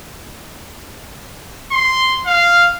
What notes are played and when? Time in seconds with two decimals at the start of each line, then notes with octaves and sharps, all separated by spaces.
1.72 C6
2.27 F5